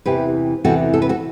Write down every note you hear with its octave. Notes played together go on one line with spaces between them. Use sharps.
E2 C3 E3 G4 B4
E2 C3 E3 F#4 A4
A4
B4
F#4 A4